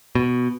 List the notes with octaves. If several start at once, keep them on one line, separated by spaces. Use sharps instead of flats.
B2